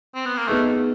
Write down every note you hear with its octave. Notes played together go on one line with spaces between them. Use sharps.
C4
B3
A#3
A3 B3 D#4 G#4 B4